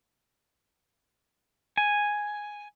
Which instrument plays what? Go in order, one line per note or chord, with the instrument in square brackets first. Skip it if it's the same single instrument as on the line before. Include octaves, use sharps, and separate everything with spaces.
[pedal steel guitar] G#5